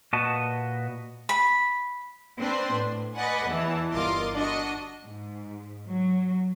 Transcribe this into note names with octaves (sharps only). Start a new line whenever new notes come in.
A#2 F#4 B4 D#5 A5
B5
C4 D4 B4 C5 C6
A2
B4 D5 D#5 F#5 G#5
E2 E3 A5
G1 F4 A#4 D#5 C6 D6
D4 F#4 D#5
G#2
F#3